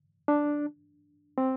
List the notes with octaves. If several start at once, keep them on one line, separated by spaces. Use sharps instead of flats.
D4
C4